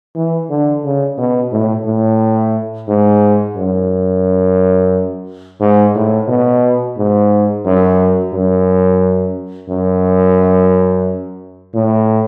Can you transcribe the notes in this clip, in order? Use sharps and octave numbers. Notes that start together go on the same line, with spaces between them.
E3
D3
C#3
B2
A2
A2
G#2
F#2
G#2
A2
B2
G#2
F#2
F#2
F#2
A2